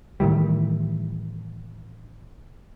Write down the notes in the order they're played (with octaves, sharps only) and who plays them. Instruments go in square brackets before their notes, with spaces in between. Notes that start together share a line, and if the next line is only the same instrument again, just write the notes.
[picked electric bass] A2 D#3 E3 G3